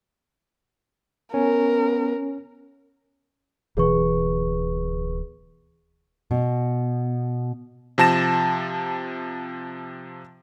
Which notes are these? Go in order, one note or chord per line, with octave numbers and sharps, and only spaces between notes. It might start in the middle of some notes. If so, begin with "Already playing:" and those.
B3 C#4 A#4
D1 B2 E3 G#4 B4 C#6
B2
C3 F3 A5 A#6 E7